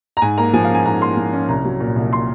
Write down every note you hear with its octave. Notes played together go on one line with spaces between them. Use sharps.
A#5
G#2 G#5
A#3 A#5
F3 G#5
F5
C#4 G#5
G#2 A#5
A#3 C6
F3
C#4
C2 A#5
F#3
A#2
C2
C6